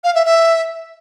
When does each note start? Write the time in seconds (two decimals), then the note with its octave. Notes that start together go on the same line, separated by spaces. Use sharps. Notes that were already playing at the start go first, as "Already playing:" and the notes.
0.04 F5
0.14 E5
0.25 E5